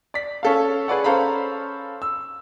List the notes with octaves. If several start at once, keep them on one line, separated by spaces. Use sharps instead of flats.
D5 B6
C#4 A4 F5
G#4 B4 D5 F#5
C#4 A4 C5 F5 A#5 B5
E6